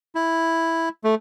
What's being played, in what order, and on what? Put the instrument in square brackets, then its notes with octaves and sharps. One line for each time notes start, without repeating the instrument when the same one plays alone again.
[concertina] E4
A3